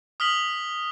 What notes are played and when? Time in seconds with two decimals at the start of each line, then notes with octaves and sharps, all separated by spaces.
0.20 D#6 F6 B6 F#7